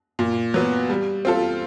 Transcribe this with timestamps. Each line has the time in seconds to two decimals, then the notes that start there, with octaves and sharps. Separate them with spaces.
0.19 A#2
0.54 F#3 B3
0.90 G3
1.25 C4 F4 A4